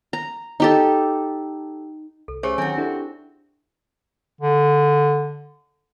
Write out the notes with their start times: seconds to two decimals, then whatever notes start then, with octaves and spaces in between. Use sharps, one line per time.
0.13 A#5
0.60 D#4 G4 A4
2.28 C2 A4
2.43 A3 C#4 G4 G#4 C5
2.58 D#3 F#3 C4 D#4 F#4 G#5
2.78 D4 E4 G4 A4
4.41 D3